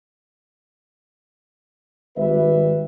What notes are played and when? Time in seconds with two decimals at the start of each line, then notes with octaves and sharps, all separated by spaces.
2.17 G#1 G3 B4 E5